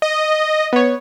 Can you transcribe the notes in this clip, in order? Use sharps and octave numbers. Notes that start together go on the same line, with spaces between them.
D#5
B3 C#5